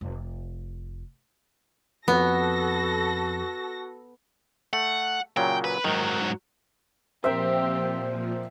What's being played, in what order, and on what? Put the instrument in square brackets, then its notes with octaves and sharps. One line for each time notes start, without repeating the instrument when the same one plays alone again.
[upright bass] F1
[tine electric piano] F2 [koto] B3 [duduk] F#4 [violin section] A4 A#6
[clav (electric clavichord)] A3 [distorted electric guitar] F#5
[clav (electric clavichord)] A#2 C#3 F#3 [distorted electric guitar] G5
[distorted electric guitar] B4
[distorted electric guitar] G#2 F#3 [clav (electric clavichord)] D#3
[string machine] A#2 F3 [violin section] C4 G4 [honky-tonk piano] A#4 C5 [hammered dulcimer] E5 G5